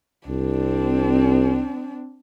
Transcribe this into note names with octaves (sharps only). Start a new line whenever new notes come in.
C2 C4 D4